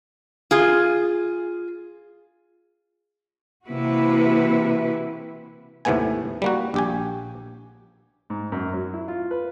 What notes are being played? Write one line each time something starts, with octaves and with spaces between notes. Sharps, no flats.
F4 G#4
C3 E3 A#3 E4 F#4 B4
D#2 A2 C3 A3 B3 G#5
G3 A#3 F#4
A#1 G4 G#5
G#2
F#2
F#3
E4
F4
B4